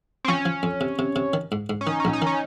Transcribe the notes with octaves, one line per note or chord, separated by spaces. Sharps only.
C4
F3 C#4
F3
F2
C3
C3
C3
D#3
G#2
G#2
C#4
D#3 D#4
C#4
A#1
D#4
D#3 C#4